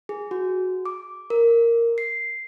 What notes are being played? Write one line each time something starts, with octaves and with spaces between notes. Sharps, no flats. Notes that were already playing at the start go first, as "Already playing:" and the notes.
G#4
F#4
D6
A#4
C7